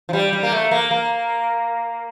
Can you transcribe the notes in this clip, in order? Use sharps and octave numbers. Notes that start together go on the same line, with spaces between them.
F3
G3
G3
A#3
A3
A#3
A#3